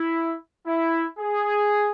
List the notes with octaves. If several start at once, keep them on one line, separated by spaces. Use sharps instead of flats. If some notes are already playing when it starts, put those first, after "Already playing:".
Already playing: E4
E4
G#4